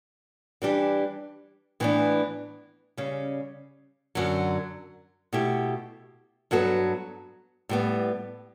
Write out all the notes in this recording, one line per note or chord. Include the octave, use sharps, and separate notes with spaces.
E3 G3 D4 G4
A2 E3 B3 D4
C#3 G3 C#4
F#2 D3 F#3
B2 A3 E4 G4
G2 F#3 B3 F#4 A4
A2 G3 B3